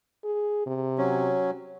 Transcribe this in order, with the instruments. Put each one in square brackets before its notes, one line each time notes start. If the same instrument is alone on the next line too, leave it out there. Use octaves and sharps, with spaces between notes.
[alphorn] G#4
C3
[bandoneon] F#3 C#4